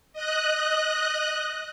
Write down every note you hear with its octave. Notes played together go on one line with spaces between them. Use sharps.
D#5 F#6